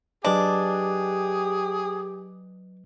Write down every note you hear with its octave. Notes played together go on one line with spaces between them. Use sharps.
F#3 D4 G4 G#4 B4 D#5